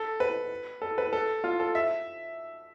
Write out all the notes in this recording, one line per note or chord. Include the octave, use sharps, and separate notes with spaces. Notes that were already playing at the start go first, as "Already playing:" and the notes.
Already playing: A4
B4
A4
B4
A4
F4
A4
E5